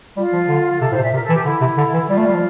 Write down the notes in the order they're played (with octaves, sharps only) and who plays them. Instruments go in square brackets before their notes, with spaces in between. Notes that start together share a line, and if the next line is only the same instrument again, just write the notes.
[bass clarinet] G3 [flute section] F4
[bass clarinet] F3
D3
[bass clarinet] C3 [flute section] A4
[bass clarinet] A2 [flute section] C5
[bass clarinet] C3
[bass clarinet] A#2 [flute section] E5
[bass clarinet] C3 [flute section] A#4
[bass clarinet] E3 [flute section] A4
[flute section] G4
[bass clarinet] D3 [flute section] E4
[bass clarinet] C3
D3
E3
[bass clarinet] G3 [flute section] F4
[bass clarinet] A3
G3
F3